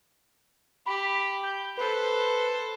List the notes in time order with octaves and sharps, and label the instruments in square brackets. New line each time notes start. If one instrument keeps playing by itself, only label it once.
[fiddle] G4 [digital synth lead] B5
[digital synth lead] G6
[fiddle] A4 C5 [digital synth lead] B4